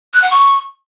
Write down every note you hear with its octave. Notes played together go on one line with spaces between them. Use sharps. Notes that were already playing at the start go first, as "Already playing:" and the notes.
F#6
F#5
C#6